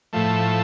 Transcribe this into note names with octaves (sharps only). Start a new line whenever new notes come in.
A2 F3 A3